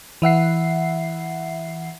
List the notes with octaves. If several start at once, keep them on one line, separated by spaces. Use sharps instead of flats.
E3 E5 F#5 C7